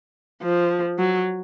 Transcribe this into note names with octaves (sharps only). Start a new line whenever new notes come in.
F3
F#3